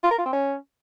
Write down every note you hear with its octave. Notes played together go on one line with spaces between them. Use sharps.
F4
A#4
F4
C4
C#4